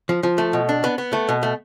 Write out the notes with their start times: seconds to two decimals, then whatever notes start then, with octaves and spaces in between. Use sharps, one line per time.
0.09 F3
0.23 F3
0.38 A3
0.53 B2
0.69 D4
0.84 B3
0.98 B3
1.13 A3
1.29 B2
1.43 A3